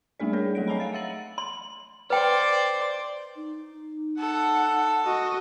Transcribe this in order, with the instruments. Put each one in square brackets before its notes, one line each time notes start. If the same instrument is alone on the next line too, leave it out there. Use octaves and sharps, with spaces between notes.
[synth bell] G3 A3 A#3 D4 G#4 D5
D4 G#4 A#4 C#5
F#3 A3 A4 C#5 D7
C#5 D#5 G#5 A#5 B5
F5 A6
E5 F#5 E6 A6 F#7
[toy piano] C6
[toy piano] B4 G5 [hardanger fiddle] C5 D5
[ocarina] D#4
[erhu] A4 [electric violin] F#5
[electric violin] F#4 D#5